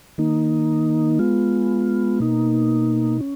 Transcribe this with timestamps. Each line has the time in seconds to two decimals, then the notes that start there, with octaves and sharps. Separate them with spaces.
0.18 D#3 A#3 D#4
1.19 G#3 B3 F4
2.20 B2 A#3 D#4
3.20 C#4